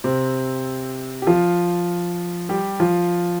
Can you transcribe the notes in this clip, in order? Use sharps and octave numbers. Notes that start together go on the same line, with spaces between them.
C3 C4
G4
F3 F4
G3 G4
F3 F4